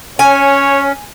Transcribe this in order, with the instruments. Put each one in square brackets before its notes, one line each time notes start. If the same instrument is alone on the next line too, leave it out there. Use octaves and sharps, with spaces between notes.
[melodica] C#4 [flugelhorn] C#5 [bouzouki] G#5